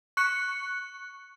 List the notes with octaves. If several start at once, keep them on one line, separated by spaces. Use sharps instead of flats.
C#6 F#6 C#7